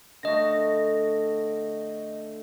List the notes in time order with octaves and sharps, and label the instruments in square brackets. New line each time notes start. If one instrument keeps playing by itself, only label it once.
[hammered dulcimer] D3 A3 C#5 [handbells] D#5 A#6